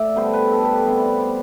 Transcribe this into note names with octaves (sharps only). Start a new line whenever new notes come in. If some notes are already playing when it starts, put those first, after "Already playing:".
Already playing: A3 D5 E5
D3 G3 B3 C5
B4
A4
G4
C3 G3 B3 C5
D5
C5